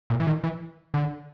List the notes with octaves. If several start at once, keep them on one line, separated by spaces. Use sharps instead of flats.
A#2
E3
D#3
E3
D3